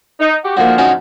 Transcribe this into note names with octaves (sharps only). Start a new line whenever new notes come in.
D#4
F#4 G4
G#2 D3 F3 A#3 F#4
C#4 D#4 F#4